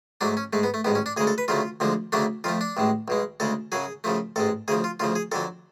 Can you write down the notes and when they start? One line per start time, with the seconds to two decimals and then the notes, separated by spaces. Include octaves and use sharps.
0.21 G#2 F#3 A3 D4
0.37 C#4
0.53 G#2 G#3 A3
0.63 B3
0.74 A3
0.85 A1 G#2 G#3 B3
0.95 C#4
1.06 D4
1.17 D2 C#3 G#3 G#4
1.27 A4
1.38 B4
1.48 D2 C#3 F#3 A3 F4
1.80 D2 D3 F3 G#3
2.12 D2 C#3 F#3 A3 D4
2.44 F2 F3 A3 F4
2.61 D4
2.77 A1 A2 G#3
3.08 B1 B2 G#3
3.40 D2 C#3 G#3 A4
3.72 F#2 C#3 F#3 G#4
4.04 F#2 C#3 F3 A3
4.36 A1 G#2 G#3 A4
4.68 D2 C#3 F3 G#4
4.84 F4
5.00 D2 C#3 F3 F4
5.15 G#4
5.32 F2 D3 F#3 A4